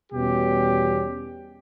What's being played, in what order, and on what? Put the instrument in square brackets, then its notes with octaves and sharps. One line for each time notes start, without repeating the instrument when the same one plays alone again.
[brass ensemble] E2 B2 G3 C#4 G4